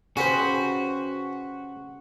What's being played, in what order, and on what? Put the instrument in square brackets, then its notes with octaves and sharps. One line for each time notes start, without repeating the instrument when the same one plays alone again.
[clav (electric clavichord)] C#3 [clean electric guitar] F#4 [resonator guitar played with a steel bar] G4 C5 [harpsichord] B4 G#5